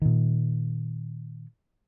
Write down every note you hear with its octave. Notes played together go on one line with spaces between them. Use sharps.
A#2 D#3